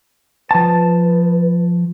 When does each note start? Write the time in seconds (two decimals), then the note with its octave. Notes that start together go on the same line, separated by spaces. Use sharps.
0.51 F3 B4 A5